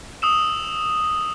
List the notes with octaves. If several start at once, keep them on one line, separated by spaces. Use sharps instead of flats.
D#6 E6 E7